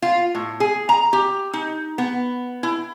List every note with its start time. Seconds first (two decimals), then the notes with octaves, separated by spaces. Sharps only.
0.02 F4
0.35 A2
0.60 G#4
0.89 A#5
1.13 G4
1.53 D#4
1.98 B3
2.63 E4